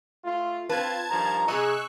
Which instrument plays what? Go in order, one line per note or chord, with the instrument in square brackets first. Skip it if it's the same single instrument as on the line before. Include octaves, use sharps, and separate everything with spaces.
[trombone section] A3 F4
[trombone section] C4 F4 [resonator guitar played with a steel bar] B4 [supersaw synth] A5 G#6
[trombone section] G2 D#3 F3 [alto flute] A#5
[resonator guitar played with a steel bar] C3 D#5 [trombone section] G#4 [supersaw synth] C#6 E6 F#6